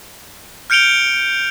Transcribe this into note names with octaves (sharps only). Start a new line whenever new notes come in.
F6 G6 C#7 D7 F7 G7